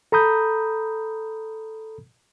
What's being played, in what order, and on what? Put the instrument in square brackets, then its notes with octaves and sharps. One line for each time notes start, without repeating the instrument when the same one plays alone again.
[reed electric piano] A4 A#5 B5 D#6 G6